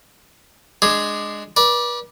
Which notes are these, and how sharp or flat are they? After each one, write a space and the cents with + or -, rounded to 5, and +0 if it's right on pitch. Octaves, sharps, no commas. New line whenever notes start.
G#3 +0 D4 +15 G#4 +0
B4 -40 D5 +5